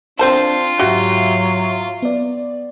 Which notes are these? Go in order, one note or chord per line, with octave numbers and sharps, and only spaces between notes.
C4 D4 F4 C5 A5
G#2 F#3 F#4 G4 E5 F5
B3 D5